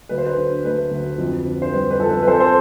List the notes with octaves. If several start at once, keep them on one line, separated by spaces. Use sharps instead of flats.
D2 B4
C5
B4
D3
A3 B4
D2
F2
D3
C5
G3 B4
B4
F2 A4
B4
B4
F2 A4 C5
A4 C5